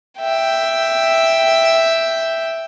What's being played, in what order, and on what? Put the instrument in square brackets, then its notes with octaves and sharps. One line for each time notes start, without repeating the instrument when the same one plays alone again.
[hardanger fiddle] E5 G5